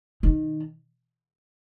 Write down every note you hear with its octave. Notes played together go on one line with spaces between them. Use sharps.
D#3